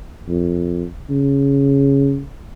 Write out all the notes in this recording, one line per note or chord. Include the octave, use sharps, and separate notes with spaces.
F2
C#3